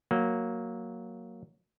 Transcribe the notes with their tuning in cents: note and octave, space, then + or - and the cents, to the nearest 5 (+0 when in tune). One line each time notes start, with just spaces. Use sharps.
F#3 +0 A#3 +0